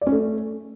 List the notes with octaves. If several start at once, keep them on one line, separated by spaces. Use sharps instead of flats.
D5
C#4
A3